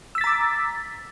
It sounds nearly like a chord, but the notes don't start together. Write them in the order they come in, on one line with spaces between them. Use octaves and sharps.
E6 B6 A6 A#5 D6